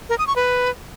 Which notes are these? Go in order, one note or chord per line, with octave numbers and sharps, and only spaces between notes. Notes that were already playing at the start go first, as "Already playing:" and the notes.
A#4
D#6
C#6
B4